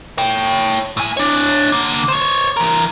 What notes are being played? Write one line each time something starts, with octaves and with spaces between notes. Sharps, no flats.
C#5 G5
A2 G#5
D4 C#5
D3 A#3
C5 C#5
E3 A#4